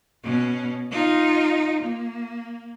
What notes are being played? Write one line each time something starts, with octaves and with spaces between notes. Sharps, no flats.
B2 C#4
D#4 F4
A#3